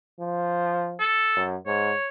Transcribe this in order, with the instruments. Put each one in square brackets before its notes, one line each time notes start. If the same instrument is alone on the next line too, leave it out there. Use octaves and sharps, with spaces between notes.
[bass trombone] F3
[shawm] A4
[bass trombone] F#2
[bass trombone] G#2 [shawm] C#5